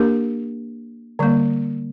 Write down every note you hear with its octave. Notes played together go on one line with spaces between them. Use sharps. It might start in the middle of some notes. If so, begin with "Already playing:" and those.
Already playing: A#3 D4 G4 A#4
D3 G3 A#3